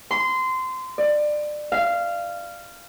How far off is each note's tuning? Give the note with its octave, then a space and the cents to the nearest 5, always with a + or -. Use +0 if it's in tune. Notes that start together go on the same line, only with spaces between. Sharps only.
C6 -20
D5 +25
F5 -15